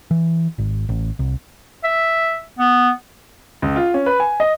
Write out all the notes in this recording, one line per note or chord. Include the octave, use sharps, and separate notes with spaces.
E3
G#1
A1
C2
E5
B3
C#2
F4
C#4
B4
G#5
D#5